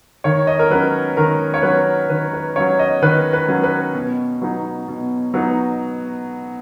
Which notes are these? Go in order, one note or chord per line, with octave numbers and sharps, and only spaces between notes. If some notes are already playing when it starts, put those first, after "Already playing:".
D#3 C#5
D#5
A#4
F#3 C#4 B4
D#3 A#4
C#5
F#3 C#4 B4
D#3 B4
B4
F#3 C#4 C#5
D#5
D#3 B4
B4
F#3 C#4
B4
B2
F#3 B3 D#4
B2
F#3 B3 D#4